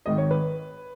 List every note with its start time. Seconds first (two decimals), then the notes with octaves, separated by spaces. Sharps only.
0.06 G#1 G#2 D#3 D#5
0.18 C#5
0.31 B4